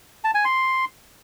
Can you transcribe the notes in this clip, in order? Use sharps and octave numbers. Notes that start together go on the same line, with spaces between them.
A5
G#5
C6